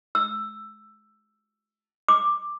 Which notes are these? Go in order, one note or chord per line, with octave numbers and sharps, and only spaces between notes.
E6
D6